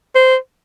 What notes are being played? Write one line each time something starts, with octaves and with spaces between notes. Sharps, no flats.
C5